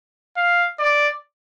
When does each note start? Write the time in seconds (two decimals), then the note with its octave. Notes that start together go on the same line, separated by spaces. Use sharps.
0.37 F5
0.79 D5